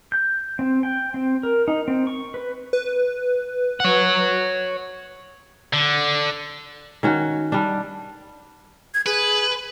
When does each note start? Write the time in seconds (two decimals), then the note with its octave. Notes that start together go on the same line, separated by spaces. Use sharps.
0.12 G6
0.59 C4
0.83 G5
1.14 C4
1.43 A#4
1.68 D#4
1.88 C4
2.07 C#6
2.34 B4
2.73 B4
3.80 C#5 F#5
5.73 D3
7.03 D#3 C#4 F#4
7.52 G3 D4
8.94 G#6
9.06 G#4 B4